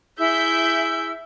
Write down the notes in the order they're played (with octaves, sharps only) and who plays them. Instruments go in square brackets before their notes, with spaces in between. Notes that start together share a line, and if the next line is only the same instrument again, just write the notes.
[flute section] E4 G#4 E6 [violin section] E5 G6